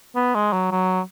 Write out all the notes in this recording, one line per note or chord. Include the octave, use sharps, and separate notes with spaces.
B3
G#3
F#3
F#3